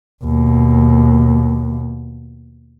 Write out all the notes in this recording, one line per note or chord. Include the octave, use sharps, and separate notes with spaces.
D#2 B2